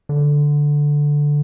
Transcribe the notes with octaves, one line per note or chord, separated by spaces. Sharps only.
D3